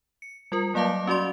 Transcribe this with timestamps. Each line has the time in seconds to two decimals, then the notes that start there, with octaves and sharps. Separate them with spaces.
0.22 C#7
0.52 G3 F4 A#4
0.74 F#3 A#3 D5 F5 A5 D6
1.07 C#4 F#4 D5 C6